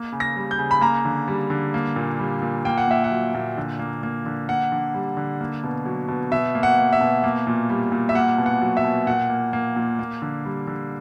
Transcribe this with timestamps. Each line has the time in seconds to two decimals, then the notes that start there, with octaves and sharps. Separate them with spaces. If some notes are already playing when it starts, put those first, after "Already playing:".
Already playing: A#3
0.12 C#3
0.20 A#6
0.36 G3
0.51 G6
0.58 C#3
0.71 B5
0.81 A#3 A#5
1.05 D3
1.28 G3
1.50 D3
1.74 A#3
1.96 A#2
2.19 G3
2.42 A#2
2.65 A#3 G5
2.78 F#5
2.87 A#2 E5
3.04 F#5
3.11 F#3
3.34 A#2
3.57 D3
3.79 A#3
4.03 A#3
4.26 D3
4.48 A#3 F#5
4.72 D3
4.94 G3
5.17 D3
5.41 A#3
5.63 B2
5.86 F#3
6.08 B2
6.31 B2 E5
6.55 A#3
6.63 F#5
6.78 A#3
6.93 E5
7.01 B2
7.24 A#3
7.47 A#2
7.69 G3
7.92 A#2
8.09 E5
8.15 A#3 F#5
8.38 B2
8.46 F#5
8.62 F#3
8.77 E5
8.84 B2
9.07 A#2 F#5
9.29 A#3
9.53 A#3
9.76 A#2
9.99 A#3
10.22 D3
10.45 G3
10.67 D3